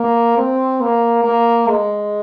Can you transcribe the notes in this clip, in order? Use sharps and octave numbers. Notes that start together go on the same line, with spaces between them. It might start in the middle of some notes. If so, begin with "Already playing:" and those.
Already playing: A#3
C4
A#3
A#3
G#3